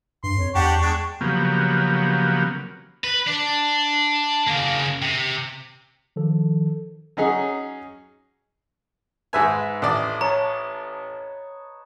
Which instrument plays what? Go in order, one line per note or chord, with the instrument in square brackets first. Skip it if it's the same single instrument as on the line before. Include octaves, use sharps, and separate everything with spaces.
[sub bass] G2 [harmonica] C6
[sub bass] F2 [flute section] C#5
[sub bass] E2 [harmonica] D4 G4 F#5 [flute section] G5 C#6
[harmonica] G#3 D4
[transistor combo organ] C#3 F3 F#3 A#3 B3 G4
[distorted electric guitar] B4
D4
C#3 A#3
C3
[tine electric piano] D#3 F3 A4
[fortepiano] F#3 C#4 D#4 G#4
[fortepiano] G#2 E5 G#5 [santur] B4 C5
[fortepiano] A1 D5 [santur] D#5
[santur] C#5 A5 [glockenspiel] A#5